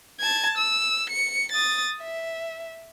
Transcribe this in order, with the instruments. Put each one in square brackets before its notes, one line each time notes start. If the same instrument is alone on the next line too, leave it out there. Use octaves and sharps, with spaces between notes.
[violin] A5 G#6
E6
C#7
D#6 A6
E5